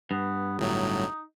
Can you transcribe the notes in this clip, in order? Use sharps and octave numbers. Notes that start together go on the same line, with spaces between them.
G2 B3
G1 A2 F#3 D#4